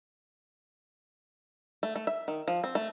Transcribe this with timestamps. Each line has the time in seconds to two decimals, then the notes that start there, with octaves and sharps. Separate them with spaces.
1.83 A3
1.96 A3
2.07 E5
2.28 D#3
2.48 F3
2.64 C4
2.75 A3